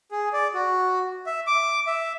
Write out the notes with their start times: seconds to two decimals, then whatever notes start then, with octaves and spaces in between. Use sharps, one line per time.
0.11 G#4
0.33 D5
0.54 F#4
1.26 E5
1.47 D6
1.87 E5